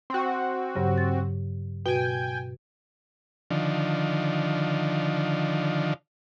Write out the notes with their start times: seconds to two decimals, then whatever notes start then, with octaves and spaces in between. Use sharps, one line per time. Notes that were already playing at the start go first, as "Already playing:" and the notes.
0.10 C4 F#4
0.75 G2 C#3 F#3
0.98 A6
1.86 B2 F#4 B4 G5 G#5
3.51 D3 D#3 F3